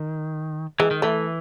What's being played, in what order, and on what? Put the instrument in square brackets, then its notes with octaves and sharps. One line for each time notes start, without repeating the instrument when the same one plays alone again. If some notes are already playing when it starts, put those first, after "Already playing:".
Already playing: [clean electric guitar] D#3
[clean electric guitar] E3 [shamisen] G#3
[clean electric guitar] D#3
[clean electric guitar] E3 [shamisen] A3